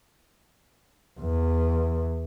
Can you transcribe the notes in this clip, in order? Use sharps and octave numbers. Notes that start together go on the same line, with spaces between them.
E2